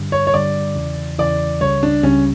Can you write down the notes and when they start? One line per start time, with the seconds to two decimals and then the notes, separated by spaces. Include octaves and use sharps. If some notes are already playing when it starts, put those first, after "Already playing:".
Already playing: G2 D3 G3
0.12 C#5
0.27 C#5
0.33 G2 D3 G3 D5
0.75 E2 C#3 E3
1.18 E2 C#3 E3 D5
1.61 C#2 C#3 G3 C#5
1.83 D4
2.03 C#2 C#3 G3 C#4